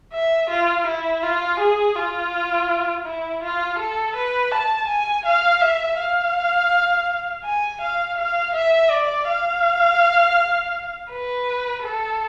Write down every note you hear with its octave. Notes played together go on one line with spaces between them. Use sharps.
E5
F4
E4
F4
G#4
F4
E4
F4
A4
B4
A5
G#5
F5
E5
F5
G#5
F5
F5
E5
D5
F5
B4
A4